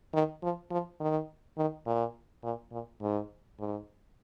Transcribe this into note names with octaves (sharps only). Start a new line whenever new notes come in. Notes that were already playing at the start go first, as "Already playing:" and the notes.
D#3
F3
F3
D#3
D#3
A#2
A#2
A#2
G#2
G#2